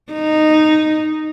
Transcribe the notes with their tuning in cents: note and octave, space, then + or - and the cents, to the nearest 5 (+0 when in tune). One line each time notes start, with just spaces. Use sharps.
D#4 -10